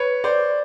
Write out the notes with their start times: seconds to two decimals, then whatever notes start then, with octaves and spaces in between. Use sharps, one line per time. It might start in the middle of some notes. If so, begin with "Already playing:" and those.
Already playing: B4 C#5
0.24 C5 D5